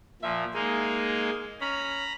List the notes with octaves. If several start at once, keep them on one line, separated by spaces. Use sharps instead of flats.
A#2 F3 E5
G#3 A#3 D#4 G#4
C#4 A#5 B5